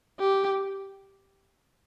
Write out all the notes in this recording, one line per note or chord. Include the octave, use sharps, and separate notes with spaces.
G4